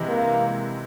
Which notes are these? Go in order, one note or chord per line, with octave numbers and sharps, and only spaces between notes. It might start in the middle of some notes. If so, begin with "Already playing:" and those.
Already playing: C3 E3 G#3
A#3